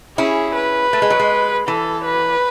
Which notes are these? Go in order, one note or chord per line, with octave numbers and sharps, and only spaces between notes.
C#4 E4 G#4
B4
A3
G#3
F#3
G#3
E3 A4
B4